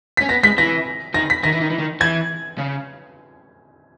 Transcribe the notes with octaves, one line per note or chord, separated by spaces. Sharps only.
C#4 B6
B3 A#6
G#3 B6
E3 A#6
D#3 A#6
B6
D#3 A#6
E3
D#3
E3
D#3
E3 G#6
C#3